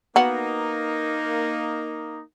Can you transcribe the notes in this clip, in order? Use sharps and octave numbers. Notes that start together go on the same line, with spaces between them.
A#3 B3 D#4 F#4